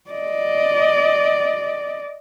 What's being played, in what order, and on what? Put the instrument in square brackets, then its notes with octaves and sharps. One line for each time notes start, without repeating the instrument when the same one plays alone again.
[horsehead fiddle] D5 D#5